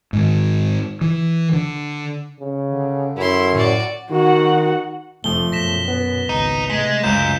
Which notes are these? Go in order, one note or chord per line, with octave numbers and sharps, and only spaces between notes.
G#2 D#3
E3
D3
C#3
D3
F#2 E4 C6
A2 F#4 D5
D#3 F#4 F#5
F1 F2 F3 A3 G7
F#2 B2 A#6 B6 E7
B3
G#1 C#2 D#4
C3 G#3 A3 B6
C#2 F#2 G6 E7